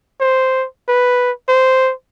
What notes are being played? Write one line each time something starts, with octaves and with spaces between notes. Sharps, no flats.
C5
B4
C5